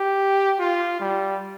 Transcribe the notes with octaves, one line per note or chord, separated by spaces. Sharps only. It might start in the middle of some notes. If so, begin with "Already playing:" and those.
Already playing: G4
F4
G3